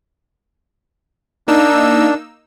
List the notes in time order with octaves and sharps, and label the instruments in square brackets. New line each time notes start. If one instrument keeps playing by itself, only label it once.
[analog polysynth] A#3 D#4 E6 [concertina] D4